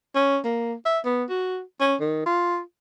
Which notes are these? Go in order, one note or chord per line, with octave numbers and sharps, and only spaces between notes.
C#4
A#3
E5
B3
F#4
C#4
D#3
F4